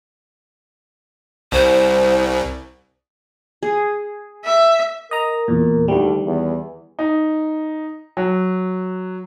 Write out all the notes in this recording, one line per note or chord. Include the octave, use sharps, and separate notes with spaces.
C2 C5
G#4
E5
A#4 D#5 A#5
E2 A#2
D2 D#3 G3
E2
D#4
F#3